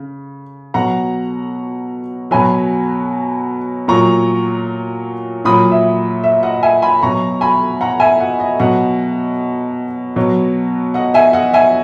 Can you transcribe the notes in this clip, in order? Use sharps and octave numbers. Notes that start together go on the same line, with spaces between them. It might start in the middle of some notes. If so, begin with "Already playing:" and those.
Already playing: C#3
B2 F#3 F#5 A#5
B2 F#3 G#5 B5
A#2 F#3 A#5 C#6
A#2 F#3 B5 D#6
E5
E5
D#5 F#5
E5 G#5
G#5 B5
B2 F#3 A#5 C#6
G#5 B5
F#5 A#5
E5 G#5
D#5 F#5
D#5
B2 F#3 D#5 F#5
B2 F#3
D#5 F#5
E5 G#5
D#5 F#5
E5 G#5